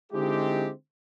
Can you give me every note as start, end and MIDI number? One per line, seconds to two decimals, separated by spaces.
0.12 0.70 50
0.12 0.70 56
0.12 0.70 60
0.12 0.70 63
0.12 0.70 64
0.12 0.70 67